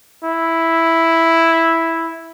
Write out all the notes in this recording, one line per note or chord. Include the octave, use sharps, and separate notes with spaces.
E4